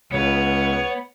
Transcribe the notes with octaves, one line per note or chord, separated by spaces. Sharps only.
C#2 B3 C#5